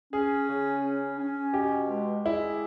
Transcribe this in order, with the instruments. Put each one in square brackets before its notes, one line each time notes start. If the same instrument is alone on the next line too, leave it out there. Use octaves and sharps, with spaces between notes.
[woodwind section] C#4 [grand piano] G#4
[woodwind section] C#3
C#4
C#4
[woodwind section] B2 [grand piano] G4
[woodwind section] G#3
[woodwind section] G#3 [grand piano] E4